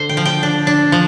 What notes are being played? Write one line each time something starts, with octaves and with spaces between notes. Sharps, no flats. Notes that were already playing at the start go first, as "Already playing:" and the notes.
Already playing: D3 C5
G5
F3
G5
D4
D4
F3